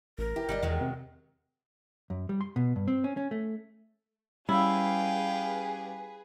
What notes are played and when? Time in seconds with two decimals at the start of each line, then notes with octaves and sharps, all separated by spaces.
0.18 A1 A#4
0.36 E3 G4
0.49 G#1 G3 D4 D#5
0.63 E2 D#3 F#3 G#3
0.81 C3
2.10 F#2
2.29 G3
2.41 C6
2.56 B2
2.76 G2
2.88 C4
3.04 C#4
3.17 C#4
3.31 A3
4.49 G3 C#4 E4 G#4 B4 F5 G5